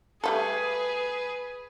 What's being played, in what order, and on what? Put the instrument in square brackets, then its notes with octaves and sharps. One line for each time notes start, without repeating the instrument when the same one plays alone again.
[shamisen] G3 A3 A4 [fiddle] G#4 B4